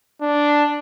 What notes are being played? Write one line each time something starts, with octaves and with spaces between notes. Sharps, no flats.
D4